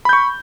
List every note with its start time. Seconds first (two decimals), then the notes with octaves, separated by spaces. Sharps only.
0.05 B5
0.09 G6
0.13 C#6